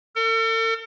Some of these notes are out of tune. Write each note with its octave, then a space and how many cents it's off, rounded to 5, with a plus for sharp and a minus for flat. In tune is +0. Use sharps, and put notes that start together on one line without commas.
A4 +45